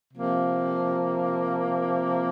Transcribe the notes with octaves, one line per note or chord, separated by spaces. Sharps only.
C3 F3 A#3